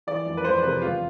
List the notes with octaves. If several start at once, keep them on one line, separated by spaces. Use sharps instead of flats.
E3 D5
F2
B4
F2 C5
C3 B4
E1 F4